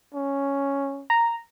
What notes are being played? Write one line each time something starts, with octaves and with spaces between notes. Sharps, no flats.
C#4
A#5